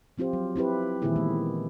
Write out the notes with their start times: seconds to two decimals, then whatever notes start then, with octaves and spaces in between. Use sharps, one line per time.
0.18 F3 C4 F4 G4 C5
0.33 F#3
0.56 C4 E4 G4 B4
1.02 A#2 D#3 E3 A#3 E4 G#4
1.16 E3 G#3 B3